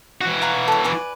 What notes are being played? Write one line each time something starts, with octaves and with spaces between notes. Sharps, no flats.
E3 F#4
F5 A#5 B5
A4 C#5
B4 D5 G#5